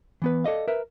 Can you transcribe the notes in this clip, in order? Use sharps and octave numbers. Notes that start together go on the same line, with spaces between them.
E3 B3 B4
A4 D5 D#5 F5
A#4 B4 E5